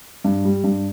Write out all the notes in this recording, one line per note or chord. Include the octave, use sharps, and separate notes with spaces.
G2
G3
G2